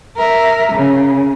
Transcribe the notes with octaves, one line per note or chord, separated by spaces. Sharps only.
A#4 E5
C#3